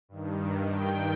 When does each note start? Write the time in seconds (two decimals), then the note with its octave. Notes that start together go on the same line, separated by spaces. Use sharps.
0.09 G2 D#3
0.71 G5